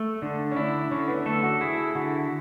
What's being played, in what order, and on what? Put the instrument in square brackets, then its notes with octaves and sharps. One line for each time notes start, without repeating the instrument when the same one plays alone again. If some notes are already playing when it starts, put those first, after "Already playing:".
Already playing: [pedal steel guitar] A3
[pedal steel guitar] D3 [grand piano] D4
[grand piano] C#4
[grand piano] D4 [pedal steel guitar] E4
[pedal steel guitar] D3 [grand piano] C#4
[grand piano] B3
[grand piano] A3 [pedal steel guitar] A4
[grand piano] F#4
[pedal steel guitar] E4 [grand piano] G#4
[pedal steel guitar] D3 [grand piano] F#4